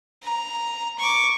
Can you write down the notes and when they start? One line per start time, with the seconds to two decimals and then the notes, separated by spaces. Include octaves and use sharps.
0.23 A#5
0.99 C#6 D6